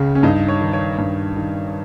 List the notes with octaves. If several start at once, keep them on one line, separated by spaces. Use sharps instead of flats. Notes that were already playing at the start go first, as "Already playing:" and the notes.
Already playing: C#2 C#3
C#4
G2 D#4
C#5
D#3
C#5
G2
D#3